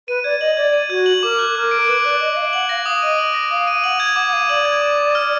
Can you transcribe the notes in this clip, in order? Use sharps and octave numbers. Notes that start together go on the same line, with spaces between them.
B4 D#7
D5 G#6
D#5 F#7
D5 G#6
D#7
F#4 G#6
F#7
A#4 D6
F#6
A#4 D6
D7
B4 D6
D5 F#6
D#5 D6
D#5
F5 D7
F#5 F#7
F5 A#6
F5 D#6
D#5 D#7
F#7
A#6
F5 D#6
D#7
F#5 F#7
G#6
F#5 D6
F#5
F5 D#7
D5 F#7
G#6
D6
D#7
F6